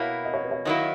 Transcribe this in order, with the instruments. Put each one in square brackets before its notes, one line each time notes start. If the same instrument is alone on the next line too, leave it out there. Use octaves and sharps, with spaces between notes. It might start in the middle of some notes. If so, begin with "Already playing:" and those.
Already playing: [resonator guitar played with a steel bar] B2 A#3 E4 [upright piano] C#5
[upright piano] D#5
C#5
B4
C#5
[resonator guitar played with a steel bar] D#3 F#3 A#3 E4 [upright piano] D#5